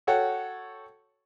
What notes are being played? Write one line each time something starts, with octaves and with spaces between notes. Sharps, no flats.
F#4 A4 C#5 F#5 G5